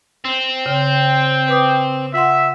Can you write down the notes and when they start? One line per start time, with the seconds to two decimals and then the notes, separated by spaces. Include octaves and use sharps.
0.25 C4
0.66 C#3 G5
1.48 B4 D6 D#6
2.14 F4 E5 F#5 C6